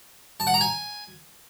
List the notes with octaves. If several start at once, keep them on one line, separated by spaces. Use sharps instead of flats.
A5
F#5
A#5
G#5